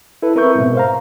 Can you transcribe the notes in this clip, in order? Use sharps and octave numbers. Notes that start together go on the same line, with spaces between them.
E4 A4 B4
C4 A#4 B4 E5 C#6 G6
G#2 B2
C5 F5 A#5